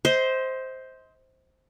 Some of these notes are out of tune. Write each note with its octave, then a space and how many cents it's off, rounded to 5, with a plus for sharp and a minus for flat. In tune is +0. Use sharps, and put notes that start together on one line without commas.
C5 +0 D#5 +40